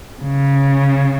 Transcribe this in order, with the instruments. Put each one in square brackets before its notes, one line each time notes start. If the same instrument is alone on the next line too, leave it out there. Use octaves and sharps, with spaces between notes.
[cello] C#3